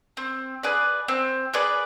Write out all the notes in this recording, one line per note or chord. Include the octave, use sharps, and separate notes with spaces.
C4
G#4 B4 D5
C4
G#4 B4 D5